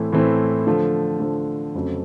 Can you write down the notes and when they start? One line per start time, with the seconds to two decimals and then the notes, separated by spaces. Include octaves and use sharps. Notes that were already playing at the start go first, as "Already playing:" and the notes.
Already playing: A2 E3 A3 C4 E4
0.13 A2 E3 A3 C4 E4
0.67 D3 F3 A3
1.20 D3 F3 A3
1.75 F2 C#3 F#3 A3 C4